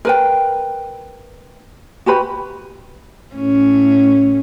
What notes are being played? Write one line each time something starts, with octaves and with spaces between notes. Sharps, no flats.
A#4 B4 G5
F#4 G4 B4 B5
A2 C#4